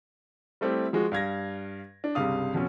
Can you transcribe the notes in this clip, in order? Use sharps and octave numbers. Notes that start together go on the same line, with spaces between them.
G3 A3 C4 E4 G4
F3 G#3 F#4
G2 F5 G#6 A#6
D4
C#2 G2 C3 F5 D#6
F2 B2 C#4